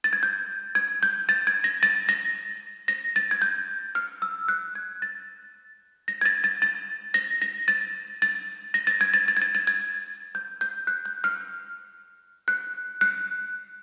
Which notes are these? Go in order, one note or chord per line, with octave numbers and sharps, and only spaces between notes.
A6
G#6
G6
G#6
G6
A6
G#6
A#6
A6
A#6
A#6
A6
G#6
G6
F6
E6
F#6
G#6
A6
A#6
G#6
A6
A6
A6
A#6
A#6
A6
A6
A#6
A6
G#6
A6
A6
G#6
A6
A6
G#6
G6
G6
F#6
G6
F6
F#6
F#6